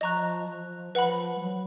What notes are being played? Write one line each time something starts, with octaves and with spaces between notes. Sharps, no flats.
F3 D#5 A#5 C#6 F#6
F3
F3 B4 F#5 B5
G#3
F#3